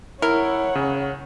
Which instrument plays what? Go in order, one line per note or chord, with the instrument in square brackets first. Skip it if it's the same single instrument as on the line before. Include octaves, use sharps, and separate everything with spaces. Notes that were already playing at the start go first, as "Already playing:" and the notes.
[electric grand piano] E4 [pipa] A#4 [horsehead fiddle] C#5 F#5
[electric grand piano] C#3